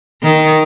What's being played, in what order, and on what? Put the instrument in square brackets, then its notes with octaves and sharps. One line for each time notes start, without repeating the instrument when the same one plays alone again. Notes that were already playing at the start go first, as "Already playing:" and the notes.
[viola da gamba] D#3